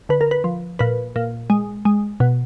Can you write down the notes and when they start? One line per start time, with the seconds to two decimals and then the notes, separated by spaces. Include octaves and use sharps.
0.09 D3 B4
0.21 A#4
0.31 B4
0.44 F3
0.79 A#2 B4
1.16 A#2
1.50 G#3
1.85 G#3
2.20 B2